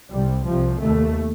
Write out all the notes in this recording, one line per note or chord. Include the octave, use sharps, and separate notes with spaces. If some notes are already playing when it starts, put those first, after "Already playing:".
C2 C3 G3
C2 C3 F3
D#2 A3